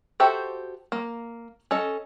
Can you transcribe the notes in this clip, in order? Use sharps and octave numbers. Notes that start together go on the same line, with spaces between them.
F#4 G4 A4 C5 E5
A#3
C#4 A4 D#5